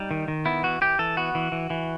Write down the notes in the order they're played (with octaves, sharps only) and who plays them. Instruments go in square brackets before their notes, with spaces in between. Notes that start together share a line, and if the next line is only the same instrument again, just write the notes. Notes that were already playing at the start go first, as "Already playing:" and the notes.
Already playing: [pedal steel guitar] G3 D#4
D#3
D#3
B3 E4
E3 F#4
E3 G4
E3 A4
B3 F#4
E3
E3
E3